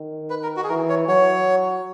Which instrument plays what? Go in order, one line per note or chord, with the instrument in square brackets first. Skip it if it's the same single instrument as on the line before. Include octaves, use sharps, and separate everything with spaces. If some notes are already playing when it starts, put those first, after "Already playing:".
Already playing: [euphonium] D#3
[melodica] B4
A#4
F#4
G#4
[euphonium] E3 [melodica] A#4
[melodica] C#5
[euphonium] F#3 [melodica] C#5